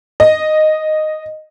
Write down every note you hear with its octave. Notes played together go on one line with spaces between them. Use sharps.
D#5